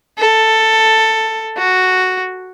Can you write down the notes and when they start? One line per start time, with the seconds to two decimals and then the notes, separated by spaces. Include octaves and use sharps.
0.19 A4
1.57 F#4